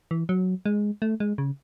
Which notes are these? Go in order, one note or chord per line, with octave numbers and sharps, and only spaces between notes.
E3
F#3
G#3
A3
G#3
C#3